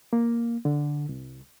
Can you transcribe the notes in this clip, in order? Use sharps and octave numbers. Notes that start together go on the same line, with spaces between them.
A#3
D3
C2